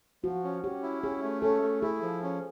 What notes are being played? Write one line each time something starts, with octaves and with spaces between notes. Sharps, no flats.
F3 F#4
C#4
C#4 G4
E4
C#4 G#4
A3
C#4 A4
A3
E4 G#4
F3
C#4